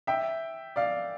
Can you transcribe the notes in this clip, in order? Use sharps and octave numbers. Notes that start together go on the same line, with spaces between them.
E5 G5
D5 F5